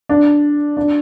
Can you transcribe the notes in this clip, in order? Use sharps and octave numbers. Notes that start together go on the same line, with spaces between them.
D4
D4